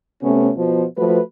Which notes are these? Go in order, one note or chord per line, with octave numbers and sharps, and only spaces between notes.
C3 A3 B3 C#4
B2 F3
F3 A3 F#4 B4